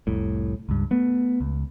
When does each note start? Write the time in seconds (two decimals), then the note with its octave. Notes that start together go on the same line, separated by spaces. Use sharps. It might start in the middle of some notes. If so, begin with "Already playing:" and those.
0.07 F1 C2 A2
0.69 C#2 G2
0.91 A3 B3
1.41 C#2